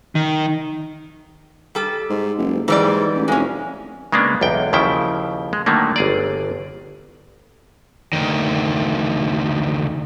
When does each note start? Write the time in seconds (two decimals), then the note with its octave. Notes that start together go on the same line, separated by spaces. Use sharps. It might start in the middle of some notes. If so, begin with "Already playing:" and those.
0.15 D#3
1.75 G3 A4
2.10 G#2
2.38 F#1
2.68 G#2 E3 G3 D5
3.15 A1
3.28 F1 G#3 C#4
4.12 C#3 G#3 A#3 B3 D4
4.41 B1 E2 G5
4.73 D#2 C#3 F3 E4 G5
5.53 G#3
5.66 D3 D#3 F#3 A3 A#3
5.96 G1 G#4 D5
8.13 D2 D#3